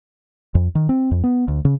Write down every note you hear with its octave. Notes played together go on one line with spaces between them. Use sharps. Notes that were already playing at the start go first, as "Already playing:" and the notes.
F2
D#3
C4
F2
B3
D2
C#3